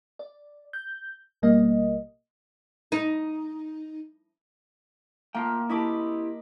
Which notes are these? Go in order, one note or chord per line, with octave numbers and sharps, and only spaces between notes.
D5
G6
A1 B2 G3 A#3 D#5
D#4
A#3 F4 G5
E4 G4 D#5 B5 D6